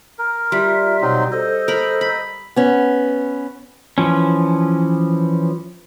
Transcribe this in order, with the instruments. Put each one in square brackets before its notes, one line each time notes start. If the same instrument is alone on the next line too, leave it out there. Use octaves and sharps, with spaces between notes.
[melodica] A#4
[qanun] G3 [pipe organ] F4 E5
[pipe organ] B2 [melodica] F#3 C4 D#4
[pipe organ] A4 C5 [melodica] D#5
[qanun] A#4 B5
B5
[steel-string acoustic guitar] B3 C#4
[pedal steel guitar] E3 F3 C#4